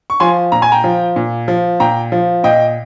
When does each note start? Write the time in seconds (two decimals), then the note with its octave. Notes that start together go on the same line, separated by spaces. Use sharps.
0.10 C#6
0.20 F3 G#5 C6
0.52 A#2 A#5
0.62 G#5
0.72 G5 A#5
0.84 F3
1.16 A#2
1.48 F3
1.80 A#2 G5 A#5
2.12 F3
2.43 A#2 D#5 G5